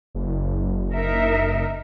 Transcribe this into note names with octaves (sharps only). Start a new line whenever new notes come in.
F#1
D#4 A#4 E5